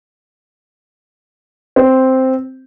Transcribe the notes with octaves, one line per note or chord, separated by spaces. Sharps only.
C4